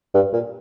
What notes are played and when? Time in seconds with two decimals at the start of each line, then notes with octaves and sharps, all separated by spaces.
0.14 G2
0.33 A#2